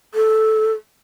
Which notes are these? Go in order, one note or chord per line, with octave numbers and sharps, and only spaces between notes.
A4